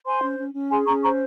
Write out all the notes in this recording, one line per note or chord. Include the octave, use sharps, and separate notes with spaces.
C5 G#5 C6
C#4
C#4
C#4
G#4 G#5 C6
C#4 A#5 C#6
C5 A#5 C#6